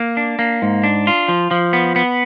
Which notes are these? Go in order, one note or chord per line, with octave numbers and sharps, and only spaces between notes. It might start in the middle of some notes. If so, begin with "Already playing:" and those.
Already playing: A#3
D4
A#3
G#2
D4
F4
F3
F3
B3
B3